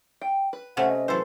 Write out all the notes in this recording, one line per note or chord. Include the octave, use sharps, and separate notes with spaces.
G5
B4
C3 A3 C#4 F#5
D#5
E3 F#3 A4 B4 C5